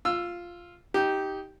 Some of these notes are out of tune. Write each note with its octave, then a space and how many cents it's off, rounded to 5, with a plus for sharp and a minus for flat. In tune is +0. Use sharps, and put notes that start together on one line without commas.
F4 +0 E6 +15
D#4 +15 G4 -10